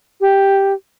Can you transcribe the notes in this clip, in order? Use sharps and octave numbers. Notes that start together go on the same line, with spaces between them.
G4